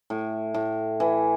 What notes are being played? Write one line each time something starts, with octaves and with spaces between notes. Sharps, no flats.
A2
A2
E3